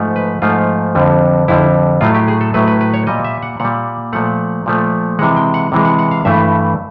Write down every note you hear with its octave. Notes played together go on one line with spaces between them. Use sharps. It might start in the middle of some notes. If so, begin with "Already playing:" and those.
Already playing: G#2 F3 A3
B4
G#2 F3 A3 F4
F2 D3 G3
F2 D3 G3 E4
A2 F#3 A3 F4
G4
G#4
A4
A2 F#3 A3 B4
B4
B4
C#5
A#2 G3 D#5
E5
F#5
A#2 G3 F#5
A#2 F3 A3 F#5
A#2 F3 A3
C3 E3 G#3 F#5
G5
F#5
C3 E3 G#3
F#5
F#5
F5
G2 E3 A3 E5